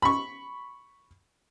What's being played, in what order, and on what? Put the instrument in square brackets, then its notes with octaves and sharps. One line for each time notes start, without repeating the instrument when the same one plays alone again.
[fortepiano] B5 C#6